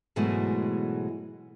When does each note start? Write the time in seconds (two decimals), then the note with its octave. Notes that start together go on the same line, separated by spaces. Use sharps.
0.16 G#2 B2 E3 F#3 G#3 A3